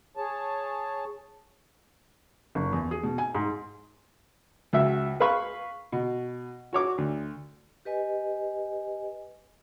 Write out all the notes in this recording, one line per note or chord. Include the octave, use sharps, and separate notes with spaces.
G#4 C#5 A5
F#1
E2
G#4
B2
G#5
G#2
C#2 F#4 E5
G#4 B4 F5 B5 C#6
B2
F#4 C#5 D6
D2
G4 B4 D#5 G#5